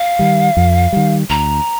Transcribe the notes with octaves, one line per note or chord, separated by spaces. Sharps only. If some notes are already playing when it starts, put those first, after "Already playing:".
Already playing: F5
D#3 G3
F2
D#3 G3
D2 A#5